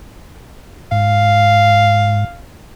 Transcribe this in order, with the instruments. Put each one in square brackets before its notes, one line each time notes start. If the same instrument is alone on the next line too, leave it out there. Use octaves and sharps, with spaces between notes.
[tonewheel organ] G#2 [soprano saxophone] F5